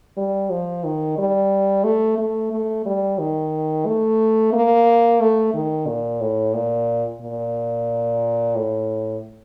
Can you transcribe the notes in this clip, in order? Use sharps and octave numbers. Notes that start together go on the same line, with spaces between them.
G3
F3
D#3
G3
A3
A3
A3
G3
D#3
A3
A#3
A3
D#3
A#2
A2
A#2
A#2
A2